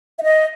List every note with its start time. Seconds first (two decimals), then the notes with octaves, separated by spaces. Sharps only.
0.19 E5
0.23 D#5